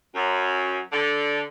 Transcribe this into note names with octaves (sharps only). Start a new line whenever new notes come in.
F#2
D3